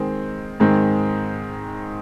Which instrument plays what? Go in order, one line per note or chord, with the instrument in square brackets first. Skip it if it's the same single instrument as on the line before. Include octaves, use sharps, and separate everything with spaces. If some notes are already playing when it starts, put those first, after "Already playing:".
Already playing: [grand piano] D#3 G#3 C4
G#2 D#3 G#3 C4